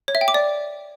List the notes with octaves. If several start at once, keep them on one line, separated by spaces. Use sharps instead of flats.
C#5
E5
G5
D6
D5